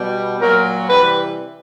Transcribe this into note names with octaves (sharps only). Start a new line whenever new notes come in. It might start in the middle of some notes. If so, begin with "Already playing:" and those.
Already playing: B2 G3
A#2 F#3 A#4
C3 E3 G3 B4